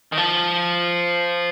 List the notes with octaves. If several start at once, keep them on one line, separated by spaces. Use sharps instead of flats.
D#3
F3